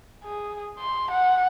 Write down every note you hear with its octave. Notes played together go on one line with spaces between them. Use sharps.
G#4
C6
F#5